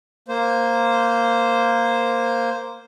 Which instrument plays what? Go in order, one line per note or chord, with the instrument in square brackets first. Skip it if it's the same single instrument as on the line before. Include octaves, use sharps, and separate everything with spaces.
[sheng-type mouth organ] A#3 C5